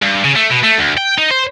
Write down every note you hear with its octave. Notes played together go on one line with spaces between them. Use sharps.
G2
C#3
A3
B2
A3
D2
G5
D#4
C5